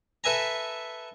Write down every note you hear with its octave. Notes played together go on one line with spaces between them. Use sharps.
A4 B4 E5 G#5 A#5